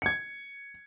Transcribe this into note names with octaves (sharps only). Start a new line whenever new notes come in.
G#6 C#7